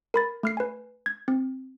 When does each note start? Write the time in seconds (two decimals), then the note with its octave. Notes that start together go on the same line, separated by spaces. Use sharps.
0.14 A#4 B5 A6
0.43 A3 F6 C7
0.57 B4 G#5
1.06 G#6
1.28 C4